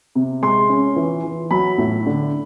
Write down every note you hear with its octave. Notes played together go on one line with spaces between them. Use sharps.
C3
G#3 C6
C#4
E3
E3
F#3 B5
A2
D3